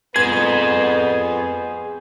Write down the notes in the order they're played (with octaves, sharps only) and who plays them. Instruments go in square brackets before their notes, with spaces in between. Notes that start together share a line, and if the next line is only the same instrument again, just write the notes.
[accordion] F2 [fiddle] B3 [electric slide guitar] G#4 C5 [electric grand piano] G#6